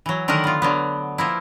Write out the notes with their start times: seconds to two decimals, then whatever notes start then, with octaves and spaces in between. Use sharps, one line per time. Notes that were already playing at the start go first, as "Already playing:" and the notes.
0.06 E3 F#3
0.28 D3 D#3 F#3 A3 A#4 F#5
0.44 B3 F4
0.62 D3 F#3 B3
1.18 F3 A#3 E4